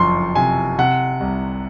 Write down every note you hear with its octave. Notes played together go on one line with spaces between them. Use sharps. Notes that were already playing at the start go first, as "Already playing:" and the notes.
Already playing: F#1 F2 F3 C6 C#6
C3 G#5
C3 F#5
C2